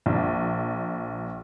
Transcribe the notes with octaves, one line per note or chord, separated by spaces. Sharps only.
A#1